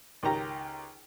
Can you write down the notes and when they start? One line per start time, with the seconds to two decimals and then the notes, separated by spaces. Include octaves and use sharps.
0.23 C#2 D#3 G4 A#5